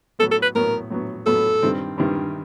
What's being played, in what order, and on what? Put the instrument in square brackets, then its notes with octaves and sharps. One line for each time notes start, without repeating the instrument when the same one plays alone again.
[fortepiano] A2 F#3 B3 [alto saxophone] A4
[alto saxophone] A4
B4
[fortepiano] A2 F#3 B3 [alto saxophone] A#4
[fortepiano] A2 F#3 B3
[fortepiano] A2 F#3 B3 [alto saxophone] A4
[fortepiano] G2 D#3 G3 C4
G2 D#3 G3 C4